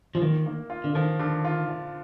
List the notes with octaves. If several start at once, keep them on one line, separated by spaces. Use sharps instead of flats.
F3
D#3 A#3
A#3
F4
D3
D#3 F3
D3
F4
F4